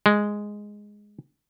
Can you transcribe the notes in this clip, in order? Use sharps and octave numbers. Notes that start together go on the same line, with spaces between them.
G#3